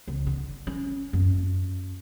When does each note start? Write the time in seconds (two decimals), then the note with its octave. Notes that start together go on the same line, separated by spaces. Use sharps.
0.08 C#2
0.27 D3
0.67 C#4
1.13 F#2